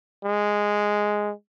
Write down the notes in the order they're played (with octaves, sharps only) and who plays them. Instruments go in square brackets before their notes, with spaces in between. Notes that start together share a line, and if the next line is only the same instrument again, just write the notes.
[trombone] G#3